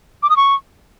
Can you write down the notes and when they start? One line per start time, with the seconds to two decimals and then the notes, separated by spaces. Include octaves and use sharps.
0.23 D6
0.30 D#6
0.37 C#6